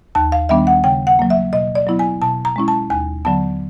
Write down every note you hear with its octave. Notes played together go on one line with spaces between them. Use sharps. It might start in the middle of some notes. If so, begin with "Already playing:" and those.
D#2 A5
F5
D#3 G3 B3 D4 E5
F#5
C#3 G5
F#5
F#3 A#3
E5
B2 D#5
D5
F#3 B3 E4
G#5
B2 A5
A#5
G#3 C#4 E4
A5
D#2 G#5
D3 F#3 B3 A5